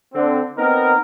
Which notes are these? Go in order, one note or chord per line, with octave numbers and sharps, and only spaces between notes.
D3 C4
B3 C4 D#4 A#4